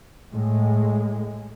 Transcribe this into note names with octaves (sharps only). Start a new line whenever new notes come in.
A2 G#3